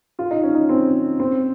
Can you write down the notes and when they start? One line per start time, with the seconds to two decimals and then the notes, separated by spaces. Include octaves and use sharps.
0.19 F4
0.31 D#4
0.43 C#4
0.55 D#4
0.69 C4
1.20 C4